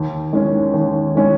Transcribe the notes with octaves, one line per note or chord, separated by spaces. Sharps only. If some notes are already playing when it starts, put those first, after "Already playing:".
Already playing: D#2
D#3 G#3 C#4
D#2
D#3 G#3 C#4